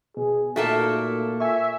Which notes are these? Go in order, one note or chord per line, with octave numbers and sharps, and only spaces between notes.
B2 G#4
A#2 A3 A#3 D#4 F#4 A4
E5 G#5 C#6